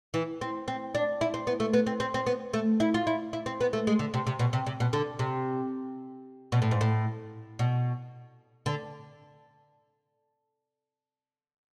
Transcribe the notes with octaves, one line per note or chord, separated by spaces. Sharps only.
E3
C4
C4
D4
E4
C4
B3
A3
B3
C4
C4
C4
B3
A3
E4
F4
E4
E4
C4
B3
A3
G#3
D3
C3
C3
B2
C3
C3
B2
D3
C3
B2
A2
G#2
A2
B2
D3